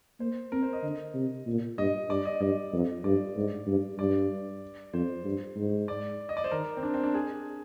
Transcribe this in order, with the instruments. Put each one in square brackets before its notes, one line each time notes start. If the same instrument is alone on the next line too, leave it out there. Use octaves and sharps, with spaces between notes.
[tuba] A#3 [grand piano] C5
[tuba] C4 [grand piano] A#4
[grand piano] C5
D#5
[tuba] D3
C3
A#2
[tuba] G2 [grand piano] D#5
[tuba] G2 [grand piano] D5
[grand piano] D#5
[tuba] G2 [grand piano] D#5
[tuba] F2
[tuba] G2 [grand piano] D5
[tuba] G#2
G2
[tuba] G2 [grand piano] D5
[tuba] F2 [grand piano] C5
[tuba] G2
G#2
[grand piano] D5
D#5
D5
C5
[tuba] D#3 [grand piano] A#4
[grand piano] C4
D4
C4
D4
G#4